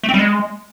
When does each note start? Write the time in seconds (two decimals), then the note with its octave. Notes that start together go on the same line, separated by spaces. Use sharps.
0.03 A3
0.09 C4
0.14 G3
0.19 G#3